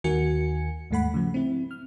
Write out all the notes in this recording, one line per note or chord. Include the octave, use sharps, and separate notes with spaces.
D#2 D#3 F#4 A#4 G#5 C#7
D#2 G#2 A3 F#5 B5
C#3 F3
C4 E4
F6